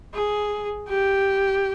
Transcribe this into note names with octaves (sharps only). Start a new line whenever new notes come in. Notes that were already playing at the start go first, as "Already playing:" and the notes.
G#4
G4